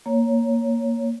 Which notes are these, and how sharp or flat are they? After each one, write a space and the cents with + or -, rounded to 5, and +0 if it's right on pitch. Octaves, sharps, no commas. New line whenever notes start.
A#3 +0 C#5 +0